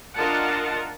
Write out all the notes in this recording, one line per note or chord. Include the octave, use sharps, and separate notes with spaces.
D4 F4 A#4 D#5 F#5 A5